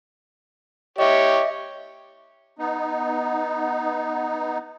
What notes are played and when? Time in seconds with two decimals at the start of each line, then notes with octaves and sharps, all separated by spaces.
0.98 G4 C#5 D#5 E5
2.59 B3 D#4